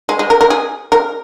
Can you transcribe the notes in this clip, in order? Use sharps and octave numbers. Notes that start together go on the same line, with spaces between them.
G#3
G#3
A#4
A#4
G#4
A#4